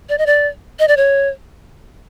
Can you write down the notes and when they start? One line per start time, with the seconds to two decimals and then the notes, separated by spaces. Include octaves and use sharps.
0.09 D5
0.18 D#5
0.26 D5
0.79 D#5
0.88 D5
0.97 C#5